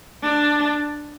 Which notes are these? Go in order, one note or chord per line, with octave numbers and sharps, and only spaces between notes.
D4